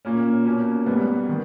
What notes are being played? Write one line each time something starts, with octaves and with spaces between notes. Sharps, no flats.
A#2 A#3 C#4
B2 A#3 C#4
G#2 G3 B3
D#3